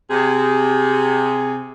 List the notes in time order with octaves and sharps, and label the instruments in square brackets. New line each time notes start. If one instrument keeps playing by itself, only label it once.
[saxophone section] C3 G#4